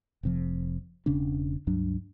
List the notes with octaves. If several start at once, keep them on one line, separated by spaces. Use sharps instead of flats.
F1 C3 F3
E1 C#3 C#4 D4
C#2 G2 F#3 D4